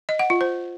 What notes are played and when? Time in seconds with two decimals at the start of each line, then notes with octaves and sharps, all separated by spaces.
0.09 D#5
0.19 F#5
0.30 F4
0.41 C5